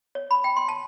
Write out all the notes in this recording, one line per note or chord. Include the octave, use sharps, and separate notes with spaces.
C#5
B5
G5
C6
A5